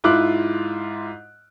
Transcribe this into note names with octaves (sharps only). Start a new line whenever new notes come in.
G#2 E4 F4 D6 F#6